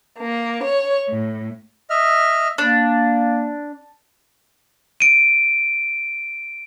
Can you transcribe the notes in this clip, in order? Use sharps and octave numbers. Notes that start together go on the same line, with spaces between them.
A#3
C#5
A2
D#5 E5 F6
A#3 D4
D7 D#7